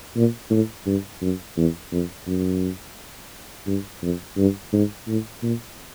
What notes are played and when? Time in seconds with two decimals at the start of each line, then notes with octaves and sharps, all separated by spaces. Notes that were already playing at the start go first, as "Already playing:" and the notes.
0.16 A#2
0.50 A2
0.86 G2
1.21 F#2
1.57 E2
1.92 F2
2.27 F#2
3.67 G2
4.02 F2
4.37 G2
4.73 G#2
5.07 A2
5.43 A#2